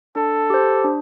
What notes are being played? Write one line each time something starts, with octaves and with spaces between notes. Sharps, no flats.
D4 A4
G4 C5
D4